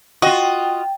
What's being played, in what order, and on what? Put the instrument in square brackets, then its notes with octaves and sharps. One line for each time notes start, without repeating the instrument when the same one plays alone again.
[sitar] F4 D#5 [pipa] F#4 [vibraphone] G5